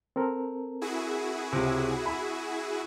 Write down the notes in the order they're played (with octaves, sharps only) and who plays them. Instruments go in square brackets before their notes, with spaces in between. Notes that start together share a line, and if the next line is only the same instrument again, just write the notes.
[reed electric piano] C4 A4 A#4
[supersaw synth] E4 F#4 G#4
[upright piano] C#2 C3
E5 B5